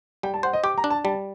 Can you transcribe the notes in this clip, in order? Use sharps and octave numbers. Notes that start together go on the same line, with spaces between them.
G3 G5
A5
C5 F#5
D#5
G4 D6
A#5
D4
A5
G3 A5